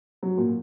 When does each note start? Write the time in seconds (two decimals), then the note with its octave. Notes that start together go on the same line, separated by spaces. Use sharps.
0.23 F#3
0.38 A#2